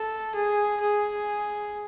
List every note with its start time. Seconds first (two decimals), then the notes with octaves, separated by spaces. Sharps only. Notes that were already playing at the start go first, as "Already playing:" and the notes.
Already playing: A4
0.35 G#4
0.81 G#4